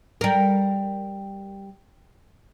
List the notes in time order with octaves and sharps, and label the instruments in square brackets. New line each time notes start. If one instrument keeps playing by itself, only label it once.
[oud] G3 A#4